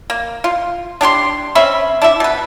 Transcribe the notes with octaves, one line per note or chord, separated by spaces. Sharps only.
A#3
F4
D4 G4 C#5 C6
C4 C#4 E5 B5
D4 E4 E5
B2 B4